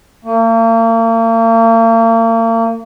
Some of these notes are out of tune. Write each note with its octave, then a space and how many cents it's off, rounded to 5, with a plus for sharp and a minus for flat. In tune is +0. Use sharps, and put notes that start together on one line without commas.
A#3 -40